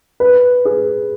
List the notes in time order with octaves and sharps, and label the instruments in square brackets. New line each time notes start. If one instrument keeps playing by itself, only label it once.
[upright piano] B4
G#4